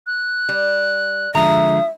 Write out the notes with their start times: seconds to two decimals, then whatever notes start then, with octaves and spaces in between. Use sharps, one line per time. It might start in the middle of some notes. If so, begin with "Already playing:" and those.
0.07 F#6
0.49 G3
1.35 D3 F3 G#3 E5 A#5 D#6